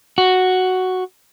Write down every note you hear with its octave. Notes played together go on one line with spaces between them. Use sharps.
F#4